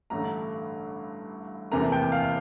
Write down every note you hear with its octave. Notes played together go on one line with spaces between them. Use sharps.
A1 G2 D3 A3 A#5
F1 E2 C3 E3 A#3 A#5
G5
F5